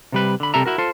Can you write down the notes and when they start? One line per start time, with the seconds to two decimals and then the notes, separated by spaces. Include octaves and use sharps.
0.12 C3 G3 B4
0.40 D3 B5
0.54 C3 G3 A4 A#4 E5 A#5
0.66 E4 F#4 A#4
0.78 F4 A4 C5